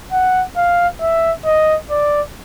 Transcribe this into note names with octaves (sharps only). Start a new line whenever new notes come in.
F#5
F5
E5
D#5
D5